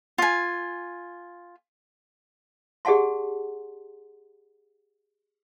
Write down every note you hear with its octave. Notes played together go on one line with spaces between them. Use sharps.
F4 G#5
G4 G#4 D5 F#5 A5 C6